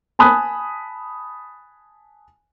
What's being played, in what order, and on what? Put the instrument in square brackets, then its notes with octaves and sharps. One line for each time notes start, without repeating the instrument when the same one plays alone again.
[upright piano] G#5 A5 B5 D#6 F#6